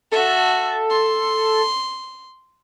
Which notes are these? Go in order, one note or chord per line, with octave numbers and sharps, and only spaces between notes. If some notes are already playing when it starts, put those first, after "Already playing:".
F#4 A4 E5
C6